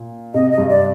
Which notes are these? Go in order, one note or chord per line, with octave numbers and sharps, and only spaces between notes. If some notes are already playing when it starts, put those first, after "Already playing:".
Already playing: A#2
C3 D#5
D#5
G2
D5